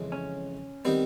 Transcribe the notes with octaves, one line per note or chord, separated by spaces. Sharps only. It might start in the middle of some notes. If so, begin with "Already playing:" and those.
Already playing: F2 C#3 E3 G#3
C#4
D#3 G3 B3 C4